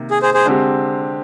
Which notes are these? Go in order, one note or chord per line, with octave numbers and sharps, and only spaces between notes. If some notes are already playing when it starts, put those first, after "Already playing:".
Already playing: C3 D#3 A#3
G#4
G#4 C5
G#4 C5
D3 G#3 C4 G4